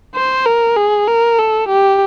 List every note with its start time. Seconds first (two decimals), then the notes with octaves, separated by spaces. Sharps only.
0.15 C5
0.46 A#4
0.77 G#4
1.08 A#4
1.38 A4
1.69 G4